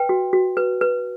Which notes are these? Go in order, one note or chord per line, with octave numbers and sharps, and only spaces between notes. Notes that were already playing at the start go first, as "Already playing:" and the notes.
Already playing: B4 G5
F#4
F#4
B4
B4